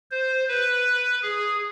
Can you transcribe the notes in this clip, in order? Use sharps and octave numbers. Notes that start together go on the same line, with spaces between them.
C5
B4
G#4